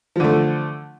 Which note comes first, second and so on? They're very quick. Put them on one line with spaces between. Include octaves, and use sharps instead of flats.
F3 D3 A3